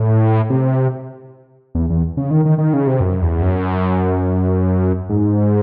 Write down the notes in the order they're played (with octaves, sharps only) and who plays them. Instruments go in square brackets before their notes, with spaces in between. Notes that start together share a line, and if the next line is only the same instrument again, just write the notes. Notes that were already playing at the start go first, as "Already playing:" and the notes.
Already playing: [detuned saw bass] A2
C3
E2
E2
C#3
D#3
D#3
D#3
C#3
C3
F#2
E2
F#2
G#2